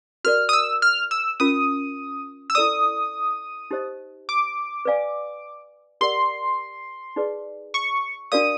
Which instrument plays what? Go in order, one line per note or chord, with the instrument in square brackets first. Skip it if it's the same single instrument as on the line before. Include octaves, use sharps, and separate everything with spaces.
[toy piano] F#4 A#4 D5 [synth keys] F6
[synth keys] D#6
E6
F6
E6
[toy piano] C#4 F4 A#4 [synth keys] D#6
[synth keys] E6
[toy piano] E4 A4 D5 [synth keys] D#6
[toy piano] D#4 G4 C5 D#5
[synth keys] D6
[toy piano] B4 D5 F5 G#5
[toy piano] G4 A#4 D5 F#5 [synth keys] C6
[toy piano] D#4 G#4 B4 D5
[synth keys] C#6
[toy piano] D4 F#4 A#4 D5 F5 [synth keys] D#6